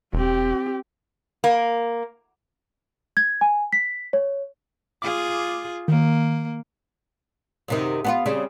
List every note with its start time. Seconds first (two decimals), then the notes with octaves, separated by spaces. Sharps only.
0.13 E1 C4 G4
1.44 A#3
3.17 G#6
3.41 G#5
3.73 B6
4.13 C#5
5.02 F4 G#4 D6
5.88 D#3 A#3
7.68 F#2 C3 D#3
8.05 B3 C#4 F4
8.26 C#3 G3 C4